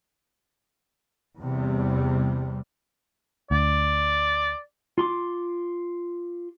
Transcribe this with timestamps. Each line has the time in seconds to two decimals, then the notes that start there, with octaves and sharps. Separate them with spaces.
1.40 E2 C3 G3
3.51 D2 D5
4.98 F4 C6 D6